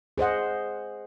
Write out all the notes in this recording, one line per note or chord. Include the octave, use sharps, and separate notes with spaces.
G#4 C5 D#5 F#5